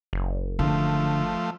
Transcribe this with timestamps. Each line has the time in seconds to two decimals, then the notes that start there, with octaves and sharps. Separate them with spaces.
0.13 F#1
0.59 D3 F3 A3